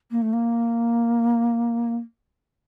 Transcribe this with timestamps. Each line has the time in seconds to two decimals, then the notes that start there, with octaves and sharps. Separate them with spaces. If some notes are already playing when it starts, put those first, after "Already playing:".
0.11 A#3
0.22 A3
0.33 A#3